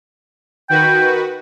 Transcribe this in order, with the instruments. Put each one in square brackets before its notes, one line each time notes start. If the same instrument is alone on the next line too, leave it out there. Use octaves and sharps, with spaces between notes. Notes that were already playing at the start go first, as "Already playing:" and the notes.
[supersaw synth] D#3 F#4 B4 [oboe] G5